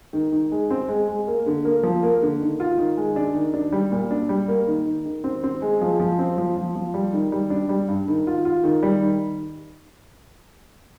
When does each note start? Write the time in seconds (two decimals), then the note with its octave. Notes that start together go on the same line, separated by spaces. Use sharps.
0.13 D#3
0.32 D#3
0.52 G#3
0.71 C4
0.88 G#3
1.08 G#3
1.27 A#3
1.46 D3
1.65 A#3
1.83 F3
2.03 A#3
2.22 D3
2.41 D#3
2.60 F4
2.78 D#3
2.97 G#3
3.16 D4
3.35 D#3
3.54 D4
3.72 G3
3.92 A#2
4.11 D4
4.29 G3
4.48 A#3
4.67 D#3
4.86 D#3
5.06 D#3
5.24 C4
5.43 C4
5.62 G#3
5.81 F3
5.99 F3
6.19 C4
6.38 F3
6.57 F3
6.75 F3
6.94 G3
7.13 D#3
7.32 G3
7.50 D4
7.69 G3
7.88 G2
8.08 D#3
8.27 F4
8.45 F4
8.64 D#3
8.83 G3
9.02 D#3